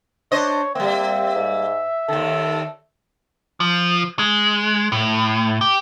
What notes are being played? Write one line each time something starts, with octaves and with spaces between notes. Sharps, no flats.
D4 C5 C#5 D#5
G3 A#3 C4 E5
G#2
D#2 D#3 A4
F3
G#3
A2
G4